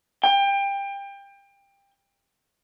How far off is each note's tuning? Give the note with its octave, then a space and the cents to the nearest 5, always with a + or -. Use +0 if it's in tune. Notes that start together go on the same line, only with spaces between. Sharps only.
G5 +25